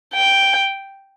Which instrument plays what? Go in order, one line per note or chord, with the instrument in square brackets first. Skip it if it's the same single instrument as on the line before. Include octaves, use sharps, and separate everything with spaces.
[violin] G5